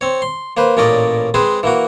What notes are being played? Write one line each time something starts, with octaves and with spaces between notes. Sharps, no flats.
C4 C#5
C6
A#3 B4 C5
A1 A#2 C#4 A#4 D5 D#5
G#3 C4 G#4 B4 C5
E3 A#3 F#4